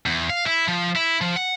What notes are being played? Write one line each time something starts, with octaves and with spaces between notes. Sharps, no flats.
E2
F5
E4
F3
E4
F3
F#5